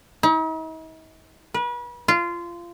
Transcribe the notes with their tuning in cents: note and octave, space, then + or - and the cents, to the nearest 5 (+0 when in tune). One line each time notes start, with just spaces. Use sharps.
D#4 +45
B4 -35
F4 -20